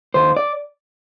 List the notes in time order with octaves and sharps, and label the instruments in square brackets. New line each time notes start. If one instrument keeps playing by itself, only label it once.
[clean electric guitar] D#2 C5
D5